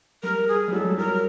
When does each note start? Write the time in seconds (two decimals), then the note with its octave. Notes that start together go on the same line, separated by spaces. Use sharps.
0.23 G3 A#4
0.48 G#4
0.68 G3
0.72 F#3 G#3 A4
0.85 G3
0.98 F#3 A#4